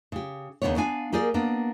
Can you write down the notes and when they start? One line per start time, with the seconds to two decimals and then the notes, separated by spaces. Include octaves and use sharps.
0.12 C#3 G4
0.62 D#2 C#3 F3 B3 D4 C#5
0.77 B3 D4 F5 G#5
1.12 A#3 G4 G#4 A#4 D5
1.34 A#3 B3 D4